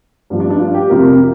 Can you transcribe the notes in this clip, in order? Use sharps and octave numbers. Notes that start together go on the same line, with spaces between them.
G2 F3
D4
D4
F4
G4
F2 C3 F3 A#4